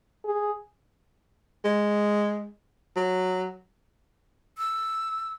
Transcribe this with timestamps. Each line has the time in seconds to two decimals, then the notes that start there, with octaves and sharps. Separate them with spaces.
0.25 G#4
1.64 G#3
2.96 F#3
4.58 E6